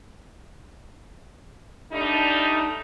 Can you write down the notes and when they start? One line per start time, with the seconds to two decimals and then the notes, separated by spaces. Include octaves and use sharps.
1.92 G3 A3 D4 D#4